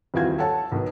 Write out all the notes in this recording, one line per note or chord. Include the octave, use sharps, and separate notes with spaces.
D#1 F2 E3 F4 F#4 G#6
A4 C#5 F#5 A5
B1 D#3 B3